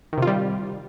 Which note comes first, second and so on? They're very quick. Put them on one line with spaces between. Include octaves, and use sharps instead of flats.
D#3 C3 F4 G3